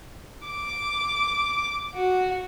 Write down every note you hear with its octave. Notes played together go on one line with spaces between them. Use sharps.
D6
F#4